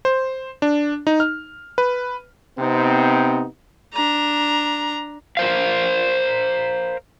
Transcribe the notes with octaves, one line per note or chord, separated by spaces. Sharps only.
C5
D4
D#4
F6
B4
C3 B3 C4 D#4
D4 A#5
A#4 C5 F5